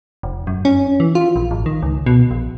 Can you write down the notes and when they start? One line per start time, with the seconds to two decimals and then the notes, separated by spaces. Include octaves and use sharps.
0.23 F1
0.47 F#2
0.65 C#4
1.00 E3
1.15 F4
1.36 A#1
1.51 G#1
1.66 D#3
1.83 C#2
2.06 B2
2.31 A#1